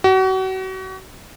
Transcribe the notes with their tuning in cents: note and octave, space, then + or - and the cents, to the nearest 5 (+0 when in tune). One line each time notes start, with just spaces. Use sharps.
F#4 +35